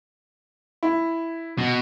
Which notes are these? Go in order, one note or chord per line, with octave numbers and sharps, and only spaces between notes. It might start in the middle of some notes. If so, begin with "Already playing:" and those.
E4
B2